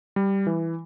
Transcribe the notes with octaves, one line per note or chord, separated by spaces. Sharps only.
G3
E3